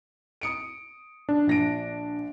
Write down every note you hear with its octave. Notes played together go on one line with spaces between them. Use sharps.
D#6 C#7 D7
D4
A#1 A#6 D7